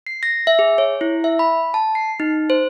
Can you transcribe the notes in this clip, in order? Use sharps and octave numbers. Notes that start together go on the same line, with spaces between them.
C7
A#6
E5
G#4
C#5
E4
E5
B5
A5
C7
D#4
C5